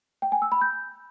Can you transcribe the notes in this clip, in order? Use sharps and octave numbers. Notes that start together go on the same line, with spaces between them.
G5
G#5
E6
B5
G6